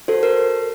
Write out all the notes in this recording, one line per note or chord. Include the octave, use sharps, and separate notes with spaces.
F#4 A4 C5
A4 A#4